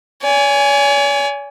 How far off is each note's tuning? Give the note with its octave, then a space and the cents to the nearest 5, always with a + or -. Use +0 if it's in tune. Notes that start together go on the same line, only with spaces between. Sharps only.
C#5 +45 G#5 +0